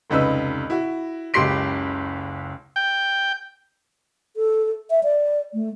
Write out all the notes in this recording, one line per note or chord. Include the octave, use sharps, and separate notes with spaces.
F1 C#2 D#4 B4 E6
E4 F#4
F#1 C#2 G4 C6 C7 D7
G5
A4
E5
D5
A3